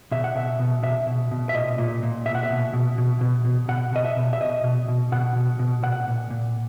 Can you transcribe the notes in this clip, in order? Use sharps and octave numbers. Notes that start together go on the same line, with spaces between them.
B2 E5
F#5
B2 E5
B2
B2 E5
B2
B2
E5
A#2 D#5
A#2
A#2
B2 E5
F#5
E5
B2
B2
B2
B2
B2
B2 F#5
B2 D#5
E5
B2
E5
B2 D#5
B2
B2
B2 F#5
B2
B2
A#2 F#5
A#2
A#2